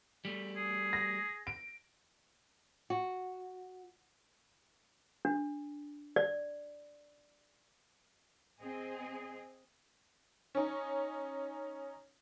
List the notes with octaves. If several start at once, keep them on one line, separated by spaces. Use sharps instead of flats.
G3 A3
G#4
A#6
D7
F#4
D4
D5
C4 G#4 D#5
C#4 D#4